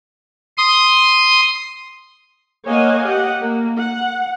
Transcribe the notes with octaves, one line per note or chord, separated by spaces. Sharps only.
C6 D#6
A#3 C#5 D#5 F5 F#5 G#5
G4 D#5 F#5
A#3
F#5